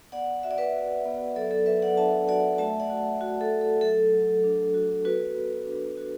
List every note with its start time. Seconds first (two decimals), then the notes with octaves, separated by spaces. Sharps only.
0.12 B3 D5 F#5
0.43 F#4 E5
0.51 D5
0.58 B4 E5
0.74 F#4
1.05 B3
1.36 F#3 A4 D5
1.51 A4
1.66 F#3 B4 E5
1.82 D5 F#5
1.97 D4 E5 A5
2.28 F#4 D5 F#5
2.58 A3 E5 A5
2.80 D5 F#5
2.90 F#4
3.21 F#4
3.41 A4
3.51 A3
3.61 A4
3.81 F#3 A4
4.13 F#3
4.44 D4
4.74 F#4
5.05 B3 F#4 B4
5.36 B3
5.66 D4
5.98 F#4